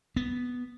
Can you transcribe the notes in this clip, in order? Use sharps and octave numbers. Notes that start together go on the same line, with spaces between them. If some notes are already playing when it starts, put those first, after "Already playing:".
B3